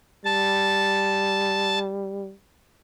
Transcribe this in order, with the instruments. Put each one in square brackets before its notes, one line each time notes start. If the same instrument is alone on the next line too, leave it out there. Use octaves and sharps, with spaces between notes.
[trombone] G3 [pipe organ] A5